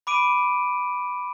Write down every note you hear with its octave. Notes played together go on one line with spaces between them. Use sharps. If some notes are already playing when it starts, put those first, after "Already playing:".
B5 D6 D7 D#7